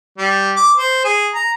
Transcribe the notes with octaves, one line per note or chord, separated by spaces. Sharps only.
G3
D6
C5
G#4
A#5